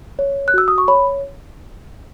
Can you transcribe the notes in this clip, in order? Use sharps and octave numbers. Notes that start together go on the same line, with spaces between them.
C#5
F#6
F#4 E6
D#6
C#6
C#5 B5